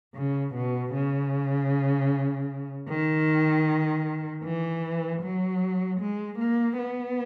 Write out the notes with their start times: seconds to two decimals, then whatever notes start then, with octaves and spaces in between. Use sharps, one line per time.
0.15 C#3
0.54 B2
0.93 C#3
2.88 D#3
4.44 E3
5.22 F#3
6.00 G#3
6.38 A#3
6.78 B3